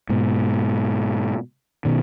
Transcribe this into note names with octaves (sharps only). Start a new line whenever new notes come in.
G#2 B2
B2 D#3